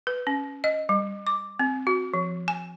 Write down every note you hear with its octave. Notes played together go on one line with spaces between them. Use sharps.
B4
C#4
D#5
G3
D6
C4
F#4
F3
G#5